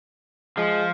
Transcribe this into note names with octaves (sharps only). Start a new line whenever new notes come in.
F3 G#3